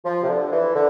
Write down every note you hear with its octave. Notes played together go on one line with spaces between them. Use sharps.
F3
C3
D3
E3
D3